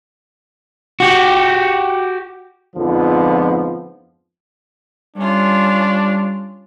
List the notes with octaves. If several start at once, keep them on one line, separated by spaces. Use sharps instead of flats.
F#4 G4
F2 G#2 D3 F3 B3
G3 C#4 D4 F4